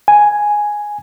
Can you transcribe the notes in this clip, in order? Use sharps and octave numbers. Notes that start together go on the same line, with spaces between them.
G#5